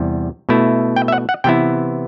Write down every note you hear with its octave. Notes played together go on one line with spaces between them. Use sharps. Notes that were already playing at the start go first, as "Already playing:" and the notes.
Already playing: E2 C3 G3
B2 A3 E4
G5
E5
F#5
F#5
C3 E3 B3 E4 G5